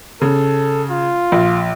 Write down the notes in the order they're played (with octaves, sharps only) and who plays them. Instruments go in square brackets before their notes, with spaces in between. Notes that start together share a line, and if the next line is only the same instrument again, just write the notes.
[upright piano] C#3 [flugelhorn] A4
[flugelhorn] F4
[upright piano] A#1